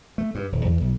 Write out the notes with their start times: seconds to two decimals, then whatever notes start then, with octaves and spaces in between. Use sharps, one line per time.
0.18 A3
0.35 G2
0.52 D#1
0.65 E2
0.81 B1